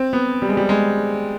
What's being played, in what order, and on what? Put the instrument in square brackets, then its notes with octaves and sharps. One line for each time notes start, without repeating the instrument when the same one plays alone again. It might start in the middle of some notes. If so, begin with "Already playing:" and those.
Already playing: [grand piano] C4
B3
G3
G#3
G3
G#3